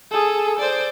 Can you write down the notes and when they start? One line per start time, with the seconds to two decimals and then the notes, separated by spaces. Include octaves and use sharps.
0.11 G#4 A4
0.59 C5 D5